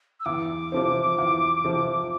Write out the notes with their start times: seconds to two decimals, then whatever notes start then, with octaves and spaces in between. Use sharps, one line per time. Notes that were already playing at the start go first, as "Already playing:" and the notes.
0.20 E6
0.25 E2 D6
0.72 C3 F3 C4
1.18 E2
1.64 C3 F3 C4